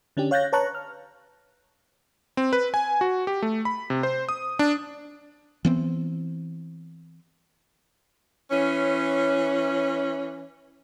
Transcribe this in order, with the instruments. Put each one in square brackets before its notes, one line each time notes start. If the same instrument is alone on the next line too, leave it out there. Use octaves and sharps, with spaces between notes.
[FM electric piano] D3 C#4 D4 G4
C#5 F5 F#6 G6 A6 A#6
B4 C#5 A5 A#5 C#6 F#6
F6
[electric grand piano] C4
B4
G#5
F#4
G4
A3
B5
C3
C5
D#6
D4
[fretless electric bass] E3 B3 C4
[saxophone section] E3 C#4